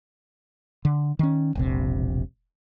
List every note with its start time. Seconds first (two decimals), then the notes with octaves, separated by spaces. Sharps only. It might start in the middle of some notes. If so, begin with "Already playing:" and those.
0.85 D3
1.19 D#3 C#4
1.55 E1 A#1 C3